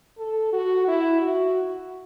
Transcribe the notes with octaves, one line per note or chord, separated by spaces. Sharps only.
A4
F#4
E4
F#4